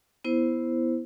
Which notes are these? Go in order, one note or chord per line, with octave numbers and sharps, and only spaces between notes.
B3 E4 C5